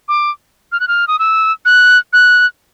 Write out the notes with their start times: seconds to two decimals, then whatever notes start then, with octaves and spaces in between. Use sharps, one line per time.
0.08 D6
0.72 F6
0.80 F#6
0.88 F6
1.08 D#6
1.19 E6
1.65 F#6
2.13 F#6